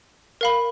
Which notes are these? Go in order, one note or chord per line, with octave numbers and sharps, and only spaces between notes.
A#4 F5 B5